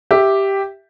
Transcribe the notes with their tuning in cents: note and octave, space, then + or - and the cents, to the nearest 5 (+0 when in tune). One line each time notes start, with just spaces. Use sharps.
G4 +0 E5 +0